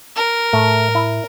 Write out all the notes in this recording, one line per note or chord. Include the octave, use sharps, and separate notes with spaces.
A#4
A2 A3
E4